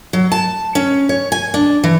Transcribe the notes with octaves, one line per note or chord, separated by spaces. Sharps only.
F#3
A5
C#4
C#5
G#5
D4
E3